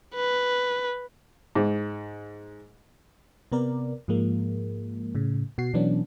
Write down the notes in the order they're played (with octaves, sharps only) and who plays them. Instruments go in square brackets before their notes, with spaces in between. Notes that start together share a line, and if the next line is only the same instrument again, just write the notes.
[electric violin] B4
[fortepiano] G#2
[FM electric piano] C3 B3 A#4 D5
G#2 F3 G#3 A#3
A2 C#3
B2 F#4 C7
B2 E3 F#3 B3 C#4 D4